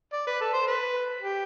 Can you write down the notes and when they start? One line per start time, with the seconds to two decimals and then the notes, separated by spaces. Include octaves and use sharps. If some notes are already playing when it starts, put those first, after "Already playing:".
0.13 D5
0.27 B4
0.41 A4
0.53 C5
0.67 B4
1.21 G4